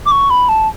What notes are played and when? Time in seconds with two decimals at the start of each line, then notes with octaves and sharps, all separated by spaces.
0.06 D6
0.11 C#6
0.30 B5
0.49 A5